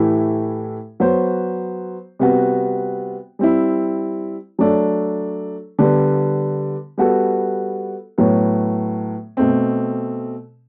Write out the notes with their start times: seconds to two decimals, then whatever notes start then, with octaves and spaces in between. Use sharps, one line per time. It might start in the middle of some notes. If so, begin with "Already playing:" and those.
Already playing: A2 E3 A3 E4 G4
1.00 F#3 B3 F#4 C5
2.19 C3 G3 B3 F#4
3.39 G3 C4 E4
4.59 F#3 A3 D4 A4
5.79 D3 G3 B3
6.98 G3 B3 F#4 A4
8.18 A2 F#3 B3
9.37 B2 A3 C4